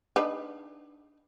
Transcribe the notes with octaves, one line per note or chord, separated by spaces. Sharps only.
D4 D#4 B4